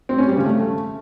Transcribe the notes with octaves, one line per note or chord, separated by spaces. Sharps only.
C4
C#4
G3
C#3
A3